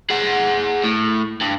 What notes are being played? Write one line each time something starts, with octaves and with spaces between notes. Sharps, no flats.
G#4 F#5
A2
G2